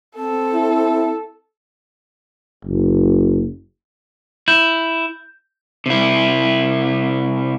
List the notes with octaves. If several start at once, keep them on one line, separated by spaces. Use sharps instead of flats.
C4 A4
E4
F#1
E4 G6
C3 E4